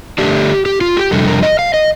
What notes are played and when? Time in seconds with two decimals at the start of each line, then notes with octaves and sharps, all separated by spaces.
0.18 D3 A3 D4 G4
0.66 G4
0.81 F4
0.97 G4
1.11 F2 C3 G3 D4 A4
1.27 A#4
1.43 D#5
1.59 F5
1.74 D#5